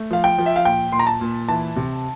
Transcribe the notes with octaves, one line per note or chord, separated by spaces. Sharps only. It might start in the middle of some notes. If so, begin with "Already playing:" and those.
Already playing: A3
F3 F5
G5
F3
E5
F5
A#2 G5
A#2 C6
A#5
A5
A#2
E3 A5
C3